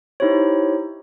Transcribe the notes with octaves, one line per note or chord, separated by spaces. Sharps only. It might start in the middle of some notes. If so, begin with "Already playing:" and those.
D#4 E4 G4 C5 C#5